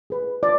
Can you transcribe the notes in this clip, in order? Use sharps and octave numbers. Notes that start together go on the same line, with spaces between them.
G#4 B4
F4 D5